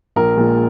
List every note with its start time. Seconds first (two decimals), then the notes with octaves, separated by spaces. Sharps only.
0.16 A#1 A#4
0.36 A#2 G#3